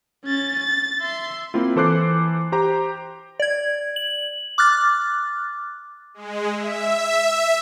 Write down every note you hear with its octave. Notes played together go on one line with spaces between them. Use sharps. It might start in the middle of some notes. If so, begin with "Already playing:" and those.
C#4 A6
A6
E5 C6
A#3 C4 E4 F4
E3 A4 C5 D6 F#6 C7
G4 C5 A#5
D5 G#6
F#7
D6 F6 F#6 A6
G#3
E5